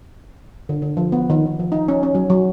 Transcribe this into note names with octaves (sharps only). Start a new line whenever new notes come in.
D3
D3
F3
B3
D#3
D#3
F3
D#4
C#4
C#4
F#3
F#3